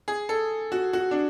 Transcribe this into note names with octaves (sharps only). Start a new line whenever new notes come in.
G#4
A4
F#4
F#4
D4